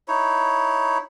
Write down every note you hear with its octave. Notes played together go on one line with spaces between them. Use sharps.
D#4 E4 C#5